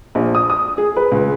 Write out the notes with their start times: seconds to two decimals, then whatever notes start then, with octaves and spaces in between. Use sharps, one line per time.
0.15 A#1
0.35 D#6
0.50 D#6
0.78 G#4
0.96 B4
1.11 C#2